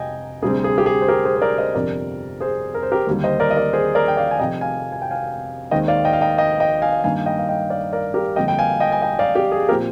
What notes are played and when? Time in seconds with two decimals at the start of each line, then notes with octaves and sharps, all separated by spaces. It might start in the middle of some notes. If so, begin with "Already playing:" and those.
Already playing: F1 C3 D#5 G5 G#5
0.42 D2 C3 G3 C4 G#4
0.64 G#4
0.78 G4
0.86 G#4
1.02 C5
1.08 G4 A#4
1.25 G#4 C5
1.36 C5
1.42 A#4 D5
1.58 C5 D#5
1.75 G1 F2 C3 A#4 D5
2.40 G#4 C5
2.75 A#4
2.83 C5
2.92 G4 A#4
3.07 D#2 D3 G3
3.24 C5 D#5
3.40 A#4 D5
3.51 D#5
3.57 A#4 D5
3.73 G#4 C5
3.95 A#4 D5
4.08 G5
4.17 D5 F5
4.31 G#5
4.39 F1 F2 C3 D#5 G5
4.61 F5 G#5
4.92 G#5
5.02 G5
5.11 F5 G#5
5.71 D#2 D#3 G#3 C4 D#5 G5
5.88 D5 F5
6.05 D#5 G5
6.13 F5
6.21 D#5 G5
6.38 D#5 G5
6.60 D#5 G5
6.82 F5 G#5
7.04 G2 D#3 A#3 F5 G#5
7.26 D#5 G5
7.39 F5
7.49 D#5 G5
7.70 D5 F5
7.93 A#4 D5
8.14 G4 A#4
8.36 F2 D3 G3 A#3 D#5 G5
8.48 G5
8.59 F5 G#5
8.80 D#5 G5
8.92 G#5
9.02 D#5 G5
9.19 D5 F5
9.35 G4
9.52 G#4
9.69 A#2 F3 C4 G4 A#4